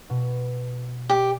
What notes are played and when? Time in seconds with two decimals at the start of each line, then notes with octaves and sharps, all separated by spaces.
0.10 B2
1.09 G4 D5